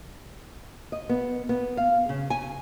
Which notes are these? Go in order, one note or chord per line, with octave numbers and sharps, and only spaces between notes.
D#5
B3
B3
F5
C#3
G#5